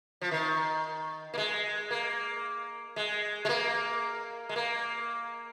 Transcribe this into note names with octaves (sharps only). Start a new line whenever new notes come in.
F3
D#3
A#3
G#3
A#3
G#3
G#3
A#3
G#3
A#3